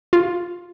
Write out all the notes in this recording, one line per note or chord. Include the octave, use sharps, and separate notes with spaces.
F4